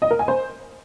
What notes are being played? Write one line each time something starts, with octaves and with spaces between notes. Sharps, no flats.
D#5
A#4
G#5
C5